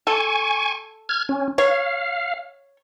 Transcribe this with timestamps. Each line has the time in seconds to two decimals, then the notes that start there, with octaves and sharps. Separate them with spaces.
0.07 A4 G#5 C#6
1.09 F6 G#6
1.29 C#4
1.58 C#5 F5